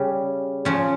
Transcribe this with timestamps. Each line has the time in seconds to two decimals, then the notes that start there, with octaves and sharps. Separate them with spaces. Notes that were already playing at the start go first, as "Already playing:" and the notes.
Already playing: C#3 G3 C#4
0.65 C#3 F3 C#4